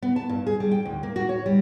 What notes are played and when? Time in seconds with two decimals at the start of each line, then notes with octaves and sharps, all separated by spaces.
0.02 B3
0.16 A5
0.29 G2
0.47 G#4
0.60 G3
0.71 G5
0.85 D2
1.03 A#3
1.16 F#4
1.29 C#5
1.46 G3